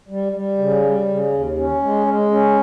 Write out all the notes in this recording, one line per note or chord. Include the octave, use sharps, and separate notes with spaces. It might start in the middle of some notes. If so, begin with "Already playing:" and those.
G3
G3
C#3
G3
C#3
D#2
C#4
G#3
G#3
C#4